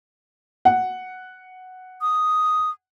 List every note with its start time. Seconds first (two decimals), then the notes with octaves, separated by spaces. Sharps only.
0.65 F#5
2.01 D#6